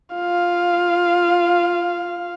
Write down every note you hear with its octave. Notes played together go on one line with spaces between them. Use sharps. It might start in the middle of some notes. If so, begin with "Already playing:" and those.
F4 F5